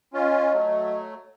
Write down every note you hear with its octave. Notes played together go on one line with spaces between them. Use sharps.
C#4 F4 D#5
F#3 A3